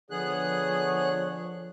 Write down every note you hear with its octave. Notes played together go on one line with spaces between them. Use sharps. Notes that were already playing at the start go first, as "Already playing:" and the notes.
D3 F3 B3 G#4 C#5 F#6